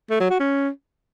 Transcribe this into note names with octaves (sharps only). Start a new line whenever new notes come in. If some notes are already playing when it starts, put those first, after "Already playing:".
A3
F#3
F#4
C#4